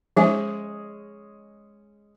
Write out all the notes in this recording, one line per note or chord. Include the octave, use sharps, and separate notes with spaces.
F3 G#3 C#4 G#4 E5